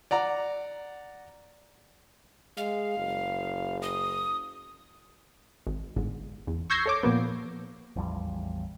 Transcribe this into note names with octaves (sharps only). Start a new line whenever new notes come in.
D5 F#5 A#5
G#3 F5
F#1
D#6
G#1
G1 G#2
E2
C#6 E6 G6 G#6 A#6 C7
A4 C#5 D6
A#2 F3 A#3 B3
A1 E2 F3 G3